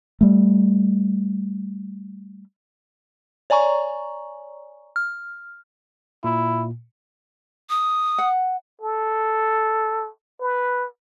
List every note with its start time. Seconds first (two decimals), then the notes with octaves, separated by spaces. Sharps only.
0.21 G3 A3
3.50 C#5 D5 G#5 A#5 C#6
4.96 F6
6.24 A#2 E4
7.70 D#6
8.18 F#5
8.81 A4
10.41 B4